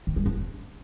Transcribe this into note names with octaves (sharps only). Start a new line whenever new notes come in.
D#3
G3
D4